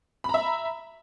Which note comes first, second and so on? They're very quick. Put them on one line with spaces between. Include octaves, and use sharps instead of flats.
B5 A#5 E5